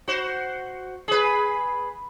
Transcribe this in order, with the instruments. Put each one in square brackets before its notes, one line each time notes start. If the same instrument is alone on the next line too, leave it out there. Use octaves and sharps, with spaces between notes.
[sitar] F#4 C5
G#4 B4